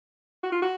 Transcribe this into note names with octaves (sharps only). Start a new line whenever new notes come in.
F#4
F4
F#4